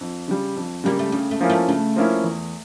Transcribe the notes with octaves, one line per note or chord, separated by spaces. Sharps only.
F2
C#3 G3
F2
C#3 G3 A#3
A3
C#3 G3
A3
F3 A#3 C#4 E4
A3
C#3 A3
F3 A#3 C#4 E4
E2